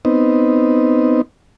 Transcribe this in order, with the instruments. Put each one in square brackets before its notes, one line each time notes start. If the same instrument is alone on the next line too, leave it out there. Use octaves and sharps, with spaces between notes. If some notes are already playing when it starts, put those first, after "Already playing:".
[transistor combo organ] B3 C4 D#4